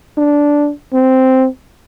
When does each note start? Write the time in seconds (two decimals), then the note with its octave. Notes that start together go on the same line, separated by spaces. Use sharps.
0.18 D4
0.93 C4